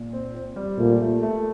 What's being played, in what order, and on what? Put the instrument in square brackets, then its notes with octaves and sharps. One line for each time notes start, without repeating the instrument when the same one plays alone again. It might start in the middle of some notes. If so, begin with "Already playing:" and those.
Already playing: [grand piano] A#2
C4
C4
G3
[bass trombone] A#2 [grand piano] A3
[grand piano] A3
A3